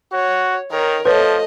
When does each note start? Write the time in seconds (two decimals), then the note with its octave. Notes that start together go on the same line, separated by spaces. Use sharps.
0.12 F#4 C#5
0.71 D#3 A#4 C#5
1.05 F3 A3 B4 C#5 D#5